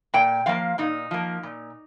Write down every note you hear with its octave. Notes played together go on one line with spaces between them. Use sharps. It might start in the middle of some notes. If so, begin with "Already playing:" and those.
A#2 G5
F3 A#3 F5
A#2 D#4
F3 A#3
A#2